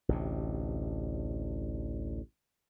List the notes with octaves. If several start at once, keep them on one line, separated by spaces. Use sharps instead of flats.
A1 D2 C3